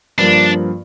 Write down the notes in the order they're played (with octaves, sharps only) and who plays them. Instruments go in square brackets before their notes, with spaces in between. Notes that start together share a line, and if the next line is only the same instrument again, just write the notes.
[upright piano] G2 F3 A#3 [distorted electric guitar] D4